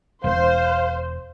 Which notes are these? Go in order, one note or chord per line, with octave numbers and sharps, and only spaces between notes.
E1 C5 F5